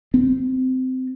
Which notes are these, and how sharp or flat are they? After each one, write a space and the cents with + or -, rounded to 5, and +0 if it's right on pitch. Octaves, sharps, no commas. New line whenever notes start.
C4 -20